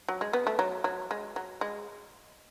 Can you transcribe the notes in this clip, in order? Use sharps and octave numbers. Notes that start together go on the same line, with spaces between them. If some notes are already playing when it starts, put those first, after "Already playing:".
F#3
G#3
B3
A3
F#3
F#3
G#3
F#3
G#3